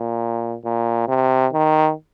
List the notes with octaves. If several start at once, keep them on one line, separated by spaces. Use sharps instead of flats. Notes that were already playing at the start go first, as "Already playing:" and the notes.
Already playing: A#2
A#2
C3
D#3